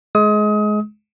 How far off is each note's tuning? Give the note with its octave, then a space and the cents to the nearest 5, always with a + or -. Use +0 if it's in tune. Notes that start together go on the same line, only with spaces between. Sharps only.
G#3 +25 D#6 +30